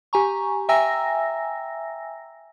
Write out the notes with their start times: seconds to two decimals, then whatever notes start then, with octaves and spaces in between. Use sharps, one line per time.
0.13 G4 G#5 A#5 C#6
0.69 E5 G5 G#5 A#5 E6 A#6